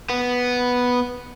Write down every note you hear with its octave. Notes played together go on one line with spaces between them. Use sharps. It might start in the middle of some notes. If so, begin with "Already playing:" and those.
B3